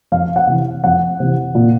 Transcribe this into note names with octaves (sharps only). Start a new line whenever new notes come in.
F2 F5
F#5
C3 E3
F2 F#5
C3 E3
A#2